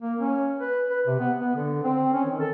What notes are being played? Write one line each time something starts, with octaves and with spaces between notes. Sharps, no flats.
A#3
C#4
B4
B4
C3
B3
B3
D3
C4
C#4
D#3
A4